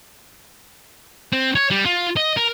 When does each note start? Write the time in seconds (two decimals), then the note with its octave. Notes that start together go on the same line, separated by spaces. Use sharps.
1.32 C4
1.55 C#5
1.71 G3
1.86 F4
2.16 D#5
2.37 A#4